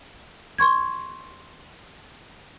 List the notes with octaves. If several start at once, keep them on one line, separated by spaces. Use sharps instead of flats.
C6 C#6 G#6